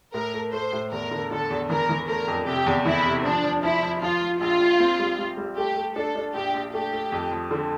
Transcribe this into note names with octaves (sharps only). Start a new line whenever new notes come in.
A2 A#4
A3
A3 C5
A2
E2 A#4
D3
D3 A4
E2
E3 A#4
E3
A3 A#4
F2
C3 G4
E2
E3 E4
C3
F3 D4
F3
F3 E4
F3
F3 F4
F3
A#1 F4
A#1
C4
G3
G3
G3
A3 G4
A3
D4 A4
D4
A#1 G4
A#1
A3 G4
A3
F2
F3
D3